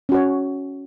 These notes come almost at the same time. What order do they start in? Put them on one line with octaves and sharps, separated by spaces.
C#4 F#4 C#5